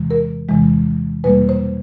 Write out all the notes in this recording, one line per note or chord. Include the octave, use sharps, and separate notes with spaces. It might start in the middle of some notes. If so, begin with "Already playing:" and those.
Already playing: E2 C3 E3 G#3
A#4
E2 C3 E3 G#3
E2 B2 G3 A#3 B4
C5